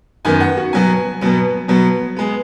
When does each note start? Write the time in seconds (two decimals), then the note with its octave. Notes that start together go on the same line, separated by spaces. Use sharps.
0.25 F#2 D#3 B3 G#5
0.40 F#5
0.57 F#4
0.73 B2 F#3 B3 G#5
1.21 B2 F#3 B3
1.68 B2 F#3 B3
2.16 G#3 B3